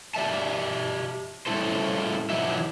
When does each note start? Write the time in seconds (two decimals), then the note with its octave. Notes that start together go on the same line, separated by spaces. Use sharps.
0.15 G4 D5 E5 A5
1.46 A2 G3 C#4 E4 A4 C5
2.30 E3 F#3 D#4 E4 G4 E5